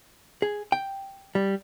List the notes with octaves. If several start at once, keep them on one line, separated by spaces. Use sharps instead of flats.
G#4
G5
G3